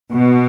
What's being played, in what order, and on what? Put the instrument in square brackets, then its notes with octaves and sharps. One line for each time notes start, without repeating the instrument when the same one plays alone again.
[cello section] B2